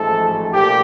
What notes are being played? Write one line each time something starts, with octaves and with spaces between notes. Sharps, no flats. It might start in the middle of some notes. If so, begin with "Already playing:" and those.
Already playing: A1 G#2 F3 A3 A4
A#1 A#2 F3 G4